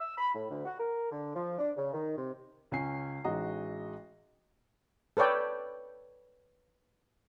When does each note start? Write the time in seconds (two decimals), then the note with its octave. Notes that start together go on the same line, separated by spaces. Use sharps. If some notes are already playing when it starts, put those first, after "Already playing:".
0.01 E6
0.18 B5
0.34 A2
0.50 D2
0.66 F#4
0.78 A#4
1.10 D3
1.35 F3
1.59 D4
1.77 C#3
1.93 D#3
2.17 C3
2.71 C#2 C#4 G#5 C7
3.24 A1 G#3 D#4 F#4 D#5 A#5
5.17 A4 B4 C#5 D5 G5